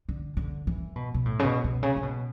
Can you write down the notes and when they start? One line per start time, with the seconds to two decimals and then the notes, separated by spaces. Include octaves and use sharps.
0.09 D3
0.37 D3
0.67 E3
0.96 B2
1.14 B2
1.25 A2
1.39 C#3
1.44 B2
1.64 B2
1.83 C#3
1.96 C#3
2.03 B2